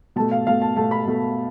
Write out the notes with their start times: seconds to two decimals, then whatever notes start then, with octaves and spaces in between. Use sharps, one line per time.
0.16 B2 A3 A5
0.31 F5
0.47 B2 A3 F5
0.62 A5
0.76 B2 A3 A5
0.91 B5
1.07 B2 A3